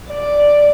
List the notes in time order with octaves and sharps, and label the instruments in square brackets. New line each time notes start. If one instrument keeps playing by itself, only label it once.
[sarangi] D5